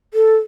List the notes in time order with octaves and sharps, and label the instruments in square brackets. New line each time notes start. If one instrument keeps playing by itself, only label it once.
[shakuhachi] A4